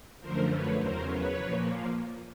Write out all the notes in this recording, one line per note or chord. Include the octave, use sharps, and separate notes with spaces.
F#2 D3 F3 A3 A#4 C5
B4 C#5
E2 C#3 F#3 A#4 C5
B4 C#5
A#2 F3 A#3